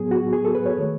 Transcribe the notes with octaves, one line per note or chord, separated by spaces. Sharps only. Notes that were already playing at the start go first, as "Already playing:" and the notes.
Already playing: A2 F#3 B3 G#4
F#4
G#4
A4
B4
C#5
D#3 A3